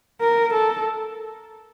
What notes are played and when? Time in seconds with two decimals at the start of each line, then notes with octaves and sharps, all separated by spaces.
0.21 A#4
0.53 A4